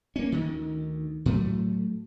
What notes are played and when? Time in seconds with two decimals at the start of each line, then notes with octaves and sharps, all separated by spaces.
0.16 A#3 C#4
0.32 D2 D#3
1.26 A2 F#3 A3